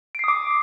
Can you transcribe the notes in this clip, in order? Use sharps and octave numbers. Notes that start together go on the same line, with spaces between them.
D6 D#6 C7 D7